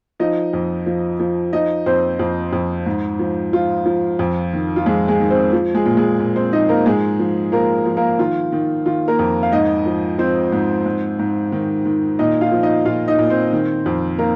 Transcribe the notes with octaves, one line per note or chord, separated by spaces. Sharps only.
F3 D#4 D#5
F2
F3
F3
F3 D#4 D#5
F2 C4 C5
F2
F2
G#2
F3
F3 F4
F3
F2
D#3
F4
F2 G#3 G#4
G#3 G#4
D#3
C4 C5
F3
G#3 G#4
A#2
G#3 G#4
A#2
C4 C5
F3 D#4 D#5
A#3 A#4
G#2 G#3 G#4
F3
F3 A#3 A#4
F3
A#3 A#4
D#3 F4
D#3
D#3 F4
A#3 A#4
F2
F5
G#2 D#4 D#5
F3
F3 C4 C5
G#2
G#2
G#2
D#3
D#3
A#2 D#4 D#5
F4 F5
F3
D#4 D#5
A#2 F4 F5
D#4 D#5
A#2
C4 C5
D#3
F2
D#3 A#3 A#4